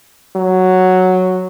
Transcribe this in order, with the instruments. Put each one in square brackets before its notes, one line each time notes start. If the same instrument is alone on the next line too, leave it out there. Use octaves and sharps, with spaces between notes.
[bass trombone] F#3